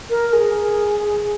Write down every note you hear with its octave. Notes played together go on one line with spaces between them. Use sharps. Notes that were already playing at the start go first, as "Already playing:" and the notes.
A#4
G#4